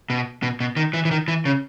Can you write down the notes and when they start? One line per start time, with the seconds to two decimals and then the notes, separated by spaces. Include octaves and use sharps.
0.10 B2
0.43 B2
0.60 B2
0.77 D#3
0.93 E3
1.05 E3
1.11 D#3
1.28 E3
1.45 C#3